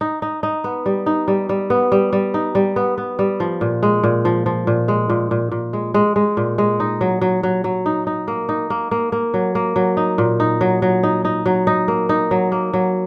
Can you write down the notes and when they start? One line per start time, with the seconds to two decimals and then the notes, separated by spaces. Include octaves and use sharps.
0.01 D#4
0.22 D#4
0.43 D#4
0.64 B3
0.86 G3
1.06 D#4
1.28 G3
1.49 G3
1.70 B3
1.92 G3
2.13 G3
2.34 D#4
2.55 G3
2.76 B3
2.98 B3
3.19 G3
3.40 F3
3.61 A#2
3.83 G#3
4.03 A#2
4.25 F3
4.46 F3
4.67 A#2
4.88 G#3
5.09 A#2
5.31 A#2
5.51 A#2
5.73 G#3
5.94 G#3
6.16 G#3
6.37 A#2
6.58 G#3
6.80 D#4
7.01 F#3
7.21 F#3
7.43 F#3
7.64 F#3
7.86 D#4
8.07 D#4
8.28 A#3
8.49 D#4
8.70 A#3
8.91 A#3
9.12 A#3
9.34 F#3
9.55 A#3
9.76 F#3
9.97 D#4
10.18 A#2
10.40 D#4
10.61 F#3
10.82 F#3
11.03 D#4
11.25 D#4
11.46 F#3
11.67 D#4
11.88 A#3
12.09 D#4
12.31 F#3
12.52 A#3
12.73 F#3